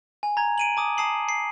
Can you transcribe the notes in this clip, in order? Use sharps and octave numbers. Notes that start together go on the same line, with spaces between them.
G#5
A#5 G#6
D7 D#7 F#7
A5 D6 D#6
A5 D#6 C7 F#7
C7